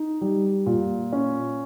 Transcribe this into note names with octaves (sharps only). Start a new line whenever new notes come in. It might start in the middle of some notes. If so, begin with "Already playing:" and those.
Already playing: D#4
G3
A#2
C#4